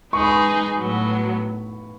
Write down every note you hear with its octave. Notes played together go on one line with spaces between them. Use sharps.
G#3 D#4 G#4 B4 C#6
B5
C#6
A2 F#3 B3